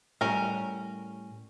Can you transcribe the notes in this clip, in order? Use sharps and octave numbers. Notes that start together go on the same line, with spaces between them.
A2 G3 C#4 A#4